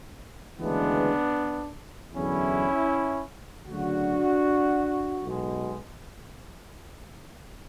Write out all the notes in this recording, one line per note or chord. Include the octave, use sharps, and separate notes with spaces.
D2 C#3 E3 G#3 B3 D4
E2 D3 F#3 C#4 E4
D2 C#3 F#3 D4 F#4
B1 B2 G#3